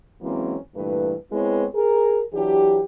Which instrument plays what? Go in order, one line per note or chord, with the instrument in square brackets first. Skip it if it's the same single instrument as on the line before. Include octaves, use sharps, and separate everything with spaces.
[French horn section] E3 F#3 G#3 A#3 C4 C#4
G2 A#2 E3 A3 B4
G#3 B3 C4 E4 B4 C#5
G#4 A#4
E3 F#3 D4 G4